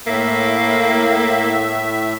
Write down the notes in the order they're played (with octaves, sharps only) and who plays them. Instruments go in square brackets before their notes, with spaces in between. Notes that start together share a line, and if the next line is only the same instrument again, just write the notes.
[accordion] A2 E5 [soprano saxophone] A#3